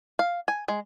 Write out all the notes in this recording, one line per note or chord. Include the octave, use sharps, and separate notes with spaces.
F5
G#5
G#3